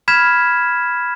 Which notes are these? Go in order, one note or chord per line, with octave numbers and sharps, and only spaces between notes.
B5 F6 G#6 B6 E7